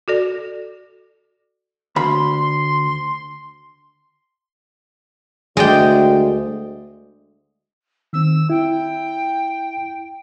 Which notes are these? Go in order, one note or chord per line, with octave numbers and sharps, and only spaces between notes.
F#4 A4 D5
D2 B5 C6
D2 G#3 D5 G5
D#3 C4 E6
E4 G5